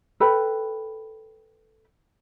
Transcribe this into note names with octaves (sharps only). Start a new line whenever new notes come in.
A4 B4 G5 B5